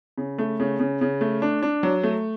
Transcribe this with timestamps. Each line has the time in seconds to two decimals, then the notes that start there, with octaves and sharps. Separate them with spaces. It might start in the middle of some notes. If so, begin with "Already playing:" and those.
0.18 C#3
0.38 A3
0.60 C#3
0.79 C#3
1.01 C#3
1.21 A3
1.42 D4
1.63 D4
1.83 F#3
2.03 A3